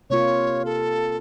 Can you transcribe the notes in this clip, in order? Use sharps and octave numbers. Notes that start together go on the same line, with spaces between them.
C3 A#3 F4 C#5
A4